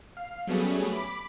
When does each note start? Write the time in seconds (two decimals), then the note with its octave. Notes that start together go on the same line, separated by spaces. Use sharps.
0.17 F5
0.47 F#3 G3 A3 B3 C#4 G#4
0.93 B5 D6 B6